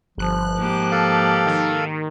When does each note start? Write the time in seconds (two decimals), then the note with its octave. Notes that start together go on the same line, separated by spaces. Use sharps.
0.18 G1 F3 F#6
0.56 G#2 A#3 G4 F#6
0.91 A4 F5
1.46 D#3